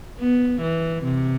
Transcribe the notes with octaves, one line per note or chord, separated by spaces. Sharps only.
B3
E3
C3